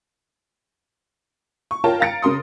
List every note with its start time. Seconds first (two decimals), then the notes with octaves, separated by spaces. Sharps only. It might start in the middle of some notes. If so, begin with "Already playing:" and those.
1.71 C#6
1.84 F4 A#4 C#5 G5 A5
2.00 F5 A#5 A6 C#7 D7
2.22 C#3 A#4 C6 D#6